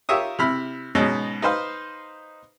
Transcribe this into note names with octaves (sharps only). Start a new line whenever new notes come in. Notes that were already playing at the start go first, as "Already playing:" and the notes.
F4 G4 A#4 C#5 E5 D#6
C3 E4 B5 F6
G#2 B2 C#4 D#4
D#4 B4 C5 F5